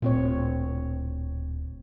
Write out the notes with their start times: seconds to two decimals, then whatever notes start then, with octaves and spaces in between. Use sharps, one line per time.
0.02 D1 A#2 C4 C#5